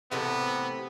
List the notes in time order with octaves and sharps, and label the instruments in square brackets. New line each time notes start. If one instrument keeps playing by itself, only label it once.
[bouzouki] A2 C3 E3 [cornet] B3